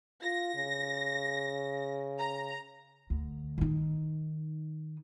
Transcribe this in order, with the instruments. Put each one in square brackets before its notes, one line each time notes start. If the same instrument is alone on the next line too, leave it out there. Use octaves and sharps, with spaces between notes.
[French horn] F4 [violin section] A#6
[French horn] C#3
[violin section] A#5
[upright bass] D2
D#3 D#4